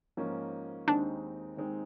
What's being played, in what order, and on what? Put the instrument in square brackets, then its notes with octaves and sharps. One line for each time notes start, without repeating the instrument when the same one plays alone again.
[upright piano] G#2 F3 A#3 C#4
[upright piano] D#2 D#3 G#3 C4 D#4 [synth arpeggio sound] D4
[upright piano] D#2 D#3 G#3 C4 D#4